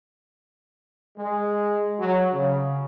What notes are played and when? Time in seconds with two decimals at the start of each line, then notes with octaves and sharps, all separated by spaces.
1.18 G#3
2.00 F#3
2.33 C#3